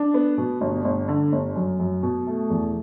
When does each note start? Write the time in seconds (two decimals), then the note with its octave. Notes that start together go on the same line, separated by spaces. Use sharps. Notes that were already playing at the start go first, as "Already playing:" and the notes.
Already playing: D4
0.14 B3
0.38 B2
0.61 G1
0.84 G1
1.08 D3
1.32 G1
1.56 F#2
1.80 F#2
2.03 B2
2.27 A3
2.50 E2